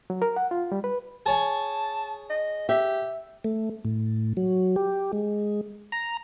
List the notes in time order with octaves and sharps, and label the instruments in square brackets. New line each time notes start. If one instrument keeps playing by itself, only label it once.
[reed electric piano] F#3
A#4
F#5
F4
G3
B4
[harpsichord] G#4 C#5 G#5 [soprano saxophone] A5
[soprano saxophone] D#5
[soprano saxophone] G4 [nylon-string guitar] E5
[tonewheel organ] A3
A2
F#3
G4
G#3
A#5